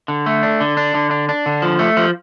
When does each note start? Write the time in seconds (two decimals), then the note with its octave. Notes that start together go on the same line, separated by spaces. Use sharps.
0.08 D3
0.26 A3
0.43 D4
0.61 D3
0.77 D4
0.95 D3
1.11 D4
1.29 D4
1.46 D3
1.62 F3
1.79 A3
1.97 F3